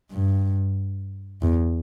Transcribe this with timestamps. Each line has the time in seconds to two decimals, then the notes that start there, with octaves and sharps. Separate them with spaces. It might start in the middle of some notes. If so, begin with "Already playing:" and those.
0.12 G2
1.42 E2